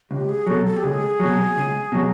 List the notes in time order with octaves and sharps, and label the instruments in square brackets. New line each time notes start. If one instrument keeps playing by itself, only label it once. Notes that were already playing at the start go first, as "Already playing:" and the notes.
[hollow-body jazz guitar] C#2 [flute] G4
[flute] G#4
[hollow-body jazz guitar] B2 F#3 [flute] A4
[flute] A4
G4
[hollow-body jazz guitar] C#2 [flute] G#4
[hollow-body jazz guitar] F#3
B2
C#2
B2 F#3